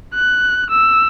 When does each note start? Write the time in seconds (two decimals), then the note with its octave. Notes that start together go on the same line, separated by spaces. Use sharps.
0.15 F#6
0.70 E6